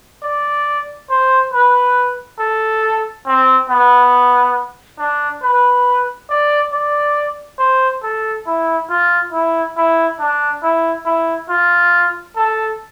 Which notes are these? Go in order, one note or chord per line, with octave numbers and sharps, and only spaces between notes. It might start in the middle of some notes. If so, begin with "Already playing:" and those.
D5
C5
B4
A4
C4
B3
D4
B4
D5
D5
C5
A4
E4
F4
E4
E4
D4
E4
E4
F4
A4